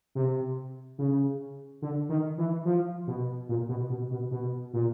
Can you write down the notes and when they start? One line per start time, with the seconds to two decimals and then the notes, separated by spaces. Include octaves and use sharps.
0.15 C3
0.98 C#3
1.82 D3
2.09 D#3
2.38 E3
2.65 F3
3.07 B2
3.49 A#2
3.69 B2
3.90 B2
4.11 B2
4.31 B2
4.73 A#2